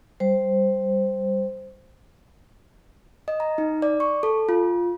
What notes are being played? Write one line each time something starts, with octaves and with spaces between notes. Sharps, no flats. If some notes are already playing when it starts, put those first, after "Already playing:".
G3 C5
D#5
A#5
D#4
D5
C#6
A4
F4